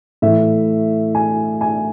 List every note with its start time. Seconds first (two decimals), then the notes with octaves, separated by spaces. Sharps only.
0.22 A2 E3 E5
1.15 G#5
1.61 G#5